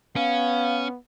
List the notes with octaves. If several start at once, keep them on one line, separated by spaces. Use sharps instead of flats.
B3 C#4 F5